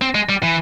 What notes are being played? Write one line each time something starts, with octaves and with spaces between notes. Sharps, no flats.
C4
G#3
G3
E3